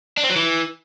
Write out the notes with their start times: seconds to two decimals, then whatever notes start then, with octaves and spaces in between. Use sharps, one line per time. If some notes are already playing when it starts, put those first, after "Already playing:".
0.17 D4
0.24 C4
0.30 F#3
0.36 E3